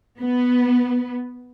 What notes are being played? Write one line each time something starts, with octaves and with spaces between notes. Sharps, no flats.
B3